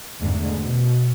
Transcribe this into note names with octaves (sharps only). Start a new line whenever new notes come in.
E2 G#2 D3 G#3 A3
B2